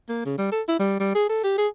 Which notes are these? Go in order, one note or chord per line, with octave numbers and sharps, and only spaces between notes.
A#3
C#3
G3
A4
E4
G3
G3
G#4
A4
G4
G#4